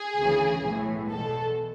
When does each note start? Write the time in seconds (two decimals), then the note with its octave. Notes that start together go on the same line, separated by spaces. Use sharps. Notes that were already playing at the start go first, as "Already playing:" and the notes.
Already playing: G#4
0.18 D2 C#3 E3
0.63 B1 A2 E3
1.10 E2 B2 A4